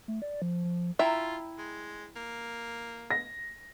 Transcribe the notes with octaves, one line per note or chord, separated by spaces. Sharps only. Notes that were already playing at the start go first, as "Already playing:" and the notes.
A3
D5
F3
F3
E4 F4 E5 G5 A#5
G#3
A#3
A#6